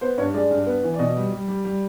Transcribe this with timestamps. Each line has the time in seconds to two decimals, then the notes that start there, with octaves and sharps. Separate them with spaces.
0.01 B3 C5
0.18 G2 C#5
0.34 G#3 D5
0.51 G2
0.66 B3
0.83 E3
0.94 D5
0.99 B2 D#5
1.16 G3
1.32 G3
1.48 G3
1.65 G3